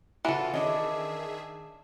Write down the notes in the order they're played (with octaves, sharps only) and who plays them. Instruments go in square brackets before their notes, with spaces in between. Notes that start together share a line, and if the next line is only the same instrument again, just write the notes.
[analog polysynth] C#3 F4 [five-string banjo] E3 A4 [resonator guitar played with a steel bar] F#4 F#5
[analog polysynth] D#3 G#4 E5 [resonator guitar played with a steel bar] C#4 D4 D#5